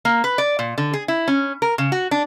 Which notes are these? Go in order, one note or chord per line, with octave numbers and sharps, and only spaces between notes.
A#3
B4
D5
A#2
D3
G#4
E4
C#4
A#4
C#3
F#4
D4